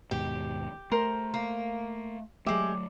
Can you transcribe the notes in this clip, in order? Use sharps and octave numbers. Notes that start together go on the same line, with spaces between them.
D#2 G#2 B2 G4
A3 A#4 C5 C6
A#3
F#3 G#3 A3 G4 E5